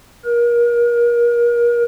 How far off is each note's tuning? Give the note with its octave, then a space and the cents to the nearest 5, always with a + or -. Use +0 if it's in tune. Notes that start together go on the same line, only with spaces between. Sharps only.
A#4 +35